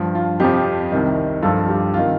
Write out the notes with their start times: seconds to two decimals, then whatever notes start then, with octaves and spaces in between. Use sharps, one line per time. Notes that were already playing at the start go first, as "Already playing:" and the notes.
Already playing: G2 F3
0.15 F4
0.40 F2 C3 F3 G4
0.92 C2 C3 D#3
1.42 G2 F3 F4 A4
1.68 G4
1.94 C3 D#3 F4